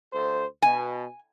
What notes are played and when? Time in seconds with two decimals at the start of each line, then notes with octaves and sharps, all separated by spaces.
0.12 D2 A4 C5
0.62 B2 G#5